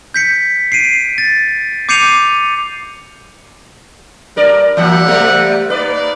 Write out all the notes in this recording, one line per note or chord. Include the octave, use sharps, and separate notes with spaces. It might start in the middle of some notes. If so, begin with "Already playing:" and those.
G6 B6 C#7
C7 D7 D#7
A6
D6 G6 C7 C#7 D#7 F7
G2 A#4 D5
E3 F#3 A#3 D5 E5 F#5
C3 G3 A3
A#3 D#4 B4 D5